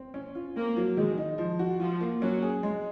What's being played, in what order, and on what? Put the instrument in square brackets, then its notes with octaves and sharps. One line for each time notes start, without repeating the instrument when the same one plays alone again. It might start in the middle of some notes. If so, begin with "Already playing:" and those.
Already playing: [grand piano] C4
C#4
F4
[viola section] A#3 [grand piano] C4
[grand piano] F#3
[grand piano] D#3 [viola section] G#3
[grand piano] D#4
F3
F#4
[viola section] F3 [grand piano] F4
[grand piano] A#3
[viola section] F#3 [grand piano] C#4
[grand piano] G#4
G#3